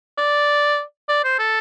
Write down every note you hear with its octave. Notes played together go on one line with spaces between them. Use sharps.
D5
D5
C5
A4